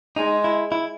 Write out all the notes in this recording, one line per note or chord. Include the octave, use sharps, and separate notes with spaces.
G#3 D#4
E4
E4